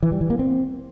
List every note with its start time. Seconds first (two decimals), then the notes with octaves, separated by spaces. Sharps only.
0.03 E3
0.12 G3
0.21 E3
0.30 A#3
0.39 C4